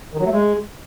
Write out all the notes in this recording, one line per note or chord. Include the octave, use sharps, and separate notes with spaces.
D#3
F#3
A3
G#3